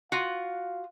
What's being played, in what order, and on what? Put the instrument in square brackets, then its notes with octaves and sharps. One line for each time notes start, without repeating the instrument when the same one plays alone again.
[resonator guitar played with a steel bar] F4 F#4 [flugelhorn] F5